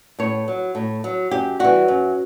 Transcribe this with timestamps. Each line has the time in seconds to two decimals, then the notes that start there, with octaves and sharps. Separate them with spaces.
0.19 A2 C#5
0.48 F#3
0.75 A2
1.04 F#3
1.31 F#2 G4
1.59 E3 G3 F#4
1.88 F#2